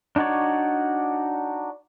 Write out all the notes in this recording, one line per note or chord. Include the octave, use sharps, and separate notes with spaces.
D4 D#4 F#4 C#5 D5